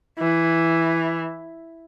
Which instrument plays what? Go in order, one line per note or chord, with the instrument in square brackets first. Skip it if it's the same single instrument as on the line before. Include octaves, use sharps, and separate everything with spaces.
[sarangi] E3